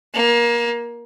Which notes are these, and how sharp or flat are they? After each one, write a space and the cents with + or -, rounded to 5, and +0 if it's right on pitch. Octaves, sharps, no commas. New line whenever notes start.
A#3 +25